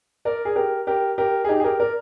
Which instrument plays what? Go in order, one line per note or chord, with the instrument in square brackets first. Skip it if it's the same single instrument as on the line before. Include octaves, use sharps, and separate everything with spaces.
[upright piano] A#4 D5
G#4
G4 A#4
G4 A#4
G4 A#4
G#4
D#4 G4
G#4
G4 A#4
A#4 D5